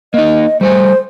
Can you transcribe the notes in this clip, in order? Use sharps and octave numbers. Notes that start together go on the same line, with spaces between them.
A#3 D#4 D#5
G3 A3 C5 G#5